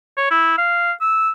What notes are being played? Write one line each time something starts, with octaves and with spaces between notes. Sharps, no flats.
C#5
E4
F5
E6